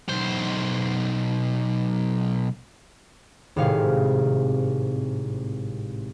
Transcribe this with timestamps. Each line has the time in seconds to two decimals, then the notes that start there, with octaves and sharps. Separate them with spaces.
0.09 B1 C5
3.56 G#1 A2 C3 F5 C#7